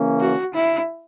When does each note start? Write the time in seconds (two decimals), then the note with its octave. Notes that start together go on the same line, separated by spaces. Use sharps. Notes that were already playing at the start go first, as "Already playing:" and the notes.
Already playing: C#3 E3 A#3 C#4
0.20 F#4
0.54 E4